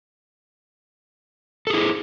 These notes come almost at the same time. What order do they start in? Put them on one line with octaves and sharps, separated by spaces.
A4 G#4 E4